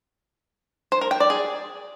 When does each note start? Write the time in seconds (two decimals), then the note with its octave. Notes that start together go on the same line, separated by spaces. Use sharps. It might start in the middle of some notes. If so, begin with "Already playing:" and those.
0.92 C5
1.01 A#4
1.11 G5
1.20 D5
1.30 G#4